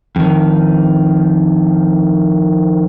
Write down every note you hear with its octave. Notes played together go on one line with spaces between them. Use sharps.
F2 D#3